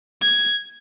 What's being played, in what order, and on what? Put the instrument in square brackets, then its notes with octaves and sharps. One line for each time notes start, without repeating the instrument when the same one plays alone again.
[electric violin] G#6